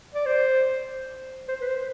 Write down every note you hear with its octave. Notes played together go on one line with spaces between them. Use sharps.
D5
C5
C5
B4
C5